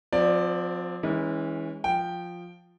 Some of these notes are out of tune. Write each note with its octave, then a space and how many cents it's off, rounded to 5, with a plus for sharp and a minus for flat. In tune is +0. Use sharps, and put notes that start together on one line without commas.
F3 +30 C4 -15 D5 +10
E3 -30 G#3 -20 C#4 +0
F3 +5 G5 +0